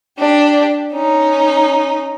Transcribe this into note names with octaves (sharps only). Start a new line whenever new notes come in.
D4 G4
C#4 D#4